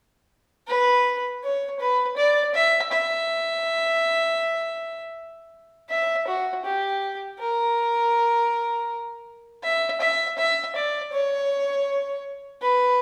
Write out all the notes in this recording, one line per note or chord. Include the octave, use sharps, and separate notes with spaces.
B4
C#5
B4
D5
E5
E5
E5
F#4
G4
A#4
E5
E5
E5
D5
C#5
B4